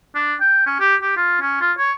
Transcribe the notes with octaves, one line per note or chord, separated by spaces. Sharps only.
D4
G5
C#4
G4
G4
F4
C#4
F4
C#5